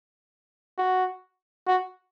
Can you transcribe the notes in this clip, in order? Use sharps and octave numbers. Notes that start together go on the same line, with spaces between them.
F#4
F#4